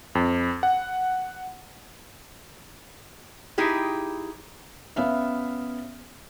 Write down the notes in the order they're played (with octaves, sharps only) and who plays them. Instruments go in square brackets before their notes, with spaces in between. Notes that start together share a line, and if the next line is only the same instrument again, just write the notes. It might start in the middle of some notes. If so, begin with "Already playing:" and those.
[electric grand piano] F2
F#5
[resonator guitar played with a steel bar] D#4 E4 G4 G#4
[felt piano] B3 C#4 E5 F5